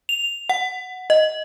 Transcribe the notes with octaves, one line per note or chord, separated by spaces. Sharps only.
F7
F#5
D#5